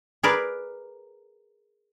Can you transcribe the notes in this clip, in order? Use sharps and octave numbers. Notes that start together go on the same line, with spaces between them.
G#4 A#4 B4 D5